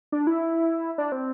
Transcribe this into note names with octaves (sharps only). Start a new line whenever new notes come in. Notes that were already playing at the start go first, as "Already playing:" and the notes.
D4
E4
D4
C4